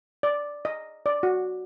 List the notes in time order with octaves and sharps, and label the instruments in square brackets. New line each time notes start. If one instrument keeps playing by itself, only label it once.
[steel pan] D5
D#5
D5
F#4